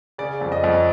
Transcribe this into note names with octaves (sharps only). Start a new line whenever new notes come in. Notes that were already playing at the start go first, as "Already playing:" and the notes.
C#3 D5
F2
D#5
F2